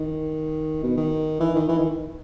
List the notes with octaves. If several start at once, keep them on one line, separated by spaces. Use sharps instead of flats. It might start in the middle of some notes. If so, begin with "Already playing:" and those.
Already playing: D#3
B2
D#3
E3
D#3
E3
D#3